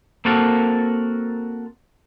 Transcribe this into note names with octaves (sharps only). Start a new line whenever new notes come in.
A#3 C4 F#4 A4 A#4